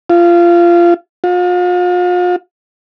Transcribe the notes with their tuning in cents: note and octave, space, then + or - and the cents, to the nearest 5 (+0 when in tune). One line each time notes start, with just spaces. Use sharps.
F4 -20
F4 +40